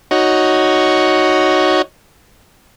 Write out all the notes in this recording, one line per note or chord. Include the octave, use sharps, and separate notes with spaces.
D#4 F#4 C#5